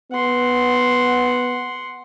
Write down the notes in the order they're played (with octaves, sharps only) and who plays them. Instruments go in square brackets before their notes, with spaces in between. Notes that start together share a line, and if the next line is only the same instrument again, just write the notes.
[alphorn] B3 [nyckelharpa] F#5 C6